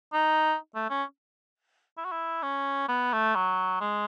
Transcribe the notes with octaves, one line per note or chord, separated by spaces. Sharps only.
D#4
A3
C#4
E4
F#4
E4
C#4
B3
A3
F#3
G#3